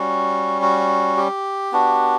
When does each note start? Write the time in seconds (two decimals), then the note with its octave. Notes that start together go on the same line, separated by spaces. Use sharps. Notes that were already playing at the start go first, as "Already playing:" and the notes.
Already playing: G3 C#4 F#4
0.62 F#4
1.17 G4
1.72 B3 D4 F#4